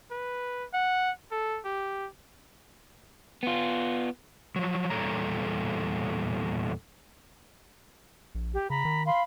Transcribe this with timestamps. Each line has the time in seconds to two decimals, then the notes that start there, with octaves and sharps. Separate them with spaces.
0.11 B4
0.74 F#5
1.31 A4
1.65 G4
3.43 B3 F4
4.56 F3 F#3
4.90 E2 A#2 G3 A4 C#5 A#5
8.35 A#1
8.54 G4
8.70 C#3 A#5 B5
8.85 D#3
9.05 F5 B5 C6